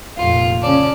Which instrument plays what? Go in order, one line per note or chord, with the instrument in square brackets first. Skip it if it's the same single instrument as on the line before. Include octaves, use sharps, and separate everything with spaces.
[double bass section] F1 A#2 [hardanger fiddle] F4
[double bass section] C#3 C#4 [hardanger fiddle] D5 A5